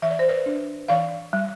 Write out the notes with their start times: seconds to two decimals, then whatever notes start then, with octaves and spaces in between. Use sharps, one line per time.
0.02 E3 E5
0.11 D5
0.19 C5
0.28 B4 D5
0.46 D4
0.88 E3 D5 F5
1.33 G3